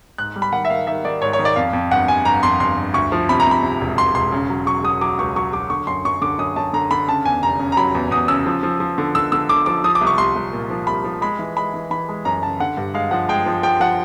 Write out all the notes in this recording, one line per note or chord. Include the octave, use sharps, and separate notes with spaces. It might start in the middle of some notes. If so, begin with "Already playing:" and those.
G#2 F#6
G3
B5
D#3 F#5
E5
D#3 F5
D#3 E5
D#3 D5
G#2 C#5
C#5
D#3
D5
F2 F5
F2
G1 F#5
G1 G#5
G1 A#5
F2 C6
G1 C6
G1
D2 C#6
F3
C3 B5
A#5
C3 B5
C3
E1
E1 C6
E1 C6
C#3
F#3
F#3 C#6
F#3 D#6
F#3 D6
C#2 C#6
F#3 C#6
F#3 D6
D3 C#6
F#2 C6
F#2 C#6
D3 D6
F#2 D#6
F#2 A5
D3 A#5
D3 B5
C#3 A5
E2 G#5
F1 A#5
C#3
A#5
F#3 B5
E2
E2 D#6
C#3 E6
F3
F3
F3
D3
D3 E6
D3 E6
D3 D6
F3 D6
F3 D#6
D6
C2
C#6
C2 C6
C2
A#2
F3
C2 B5
F3
G#3 B5
E3
G#3 B5
E3
E3 B5
G#3
F#2 A#5
C#3 A5
D3 F#5
G2
G#3 F5
F3 F#5
G#3 G5
F3
F3 G5
F3 F#5